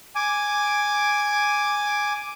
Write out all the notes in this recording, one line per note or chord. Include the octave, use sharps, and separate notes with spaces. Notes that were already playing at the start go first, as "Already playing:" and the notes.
G#5 D6